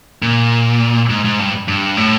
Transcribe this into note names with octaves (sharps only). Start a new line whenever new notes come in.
A#2
G#2
G#2
G2
G2
A2